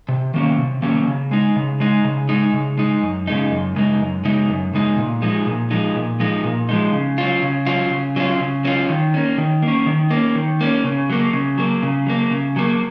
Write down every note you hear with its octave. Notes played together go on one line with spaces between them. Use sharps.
C3
D#3 F#3 A#3 C#4
C3
D#3 F#3 A#3 C#4
C#3
G#3 D#4
C#3
G#3 D#4
C#3
G#3 D#4
C#3
G#3 D#4
F#2
C#3 G#3 D#4
F#2
C#3 G#3 D#4
F#2
C#3 G#3 D#4
F#2
C#3 G#3 D#4
A#2
F3 G#3 D#4
A#2
F3 G#3 D#4
A#2
F3 G#3 D#4
A#2
F3 G#3 D#4
C#3
F#3 C#4 F4
C#3
F#3 C#4 F4
C#3
F#3 C#4 F4
C#3
F#3 C#4 F4
D#3
A#3 C#4
D#3
A#3 C#4
D#3
A#3 C#4
D#3
A#3 C#4
C#3
F#3 A#3
C#3
F#3 A#3
C#3
F#3 A#3
C#3
F#3 A#3